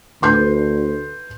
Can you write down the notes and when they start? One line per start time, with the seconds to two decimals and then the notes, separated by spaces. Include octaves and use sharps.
0.22 D2 B4 C6 G6